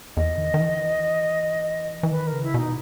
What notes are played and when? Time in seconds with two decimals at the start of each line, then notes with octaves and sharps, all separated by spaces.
0.17 E2 D#5
0.38 D#3
0.54 D#3
0.60 E3
2.03 E3
2.10 D#3 B4
2.27 A#4
2.33 C#3
2.43 E4
2.54 B2 D#4